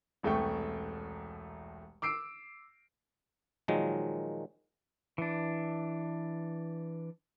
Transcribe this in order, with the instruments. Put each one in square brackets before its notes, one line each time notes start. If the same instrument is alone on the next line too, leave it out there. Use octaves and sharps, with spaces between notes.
[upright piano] E1 C2 A3 G5 C#6
D6 E6 C7 D7
[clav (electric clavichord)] A#2 D#3 F3 F#3 G#3
[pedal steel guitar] E3 D4